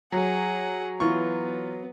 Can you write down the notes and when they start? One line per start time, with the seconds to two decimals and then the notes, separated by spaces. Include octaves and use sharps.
0.12 F#3 G#4 F#5
1.00 E3 B3 F4 C#6